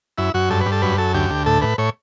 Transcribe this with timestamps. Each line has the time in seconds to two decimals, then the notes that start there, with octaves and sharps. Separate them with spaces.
0.18 F#2 E4
0.34 F#2 F#4
0.50 G2 A4
0.61 B4
0.66 G2
0.72 A4
0.82 F#2 B4
0.98 F#2 A4
1.14 D2 G4
1.30 D2
1.46 A2 A4
1.62 A2 B4
1.78 A2 C#5